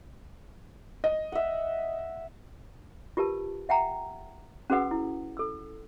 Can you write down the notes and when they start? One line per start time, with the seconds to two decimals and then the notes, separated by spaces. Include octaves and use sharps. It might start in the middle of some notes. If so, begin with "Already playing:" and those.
1.04 D#5
1.32 E5 F#5
3.17 F4 G4 A#4 B4 A5
3.69 E5 F#5 G5 A#5
4.70 C#4 F#4 G#4 B4 F#5 D#6
4.91 E4
5.37 A4 E6